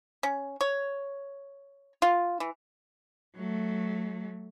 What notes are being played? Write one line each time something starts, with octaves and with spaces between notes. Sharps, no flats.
C#4
C#5
F4
E3
F#3 A3